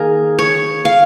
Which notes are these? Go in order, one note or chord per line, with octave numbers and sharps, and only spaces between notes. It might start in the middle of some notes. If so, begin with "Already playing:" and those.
Already playing: D#3 A#3 G#4 A#4
C#5
F5